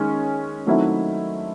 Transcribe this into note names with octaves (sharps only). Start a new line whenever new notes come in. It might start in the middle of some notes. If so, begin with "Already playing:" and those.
Already playing: D#3 G#3 C#4
D#3 F#3 A3 C4 E4